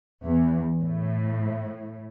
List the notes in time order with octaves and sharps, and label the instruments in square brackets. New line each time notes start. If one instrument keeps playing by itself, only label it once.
[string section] E2
A2